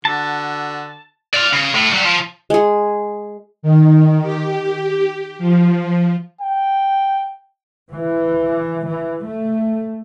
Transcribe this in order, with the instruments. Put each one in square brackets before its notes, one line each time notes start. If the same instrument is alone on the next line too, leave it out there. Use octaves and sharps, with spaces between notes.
[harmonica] D3 F#4 [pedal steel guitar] A5
[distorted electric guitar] D5 F5
C#3
A2
F#3 G3
F3
[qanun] G#3 G#4
[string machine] D#3
G4
F3
[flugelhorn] G5
[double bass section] E3
E3
A3